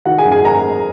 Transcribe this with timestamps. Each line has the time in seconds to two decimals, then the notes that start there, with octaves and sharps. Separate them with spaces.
0.05 D#3 F#4 F#5
0.18 G#4 G#5
0.25 F#2
0.32 G#4 G#5
0.44 A#4 A#5